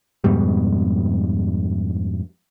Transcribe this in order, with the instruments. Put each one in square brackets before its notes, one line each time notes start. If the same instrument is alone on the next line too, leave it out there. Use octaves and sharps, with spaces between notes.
[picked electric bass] F2 G#2 B2 G3